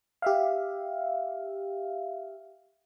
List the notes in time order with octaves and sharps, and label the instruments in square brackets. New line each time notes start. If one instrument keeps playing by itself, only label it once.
[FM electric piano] G4 E5 F5